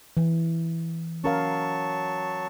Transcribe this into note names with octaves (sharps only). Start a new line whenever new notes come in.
E3
F#3 C#4 A#4 F5 A5 C#6